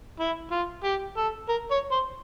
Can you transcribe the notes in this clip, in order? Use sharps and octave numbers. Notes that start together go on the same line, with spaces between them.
E4
F4
G4
A4
A#4
C#5
C5